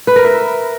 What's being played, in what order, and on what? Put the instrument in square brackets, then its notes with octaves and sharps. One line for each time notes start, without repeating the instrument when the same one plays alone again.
[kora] B4
A#4
E5